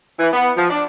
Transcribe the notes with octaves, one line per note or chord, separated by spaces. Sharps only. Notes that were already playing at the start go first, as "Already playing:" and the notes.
E3
B3
F3
D4